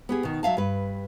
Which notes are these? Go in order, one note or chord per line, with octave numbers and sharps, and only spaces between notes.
B3 G4 G#4
B2 D#3
F#3 E5 F5 A5
G2 B4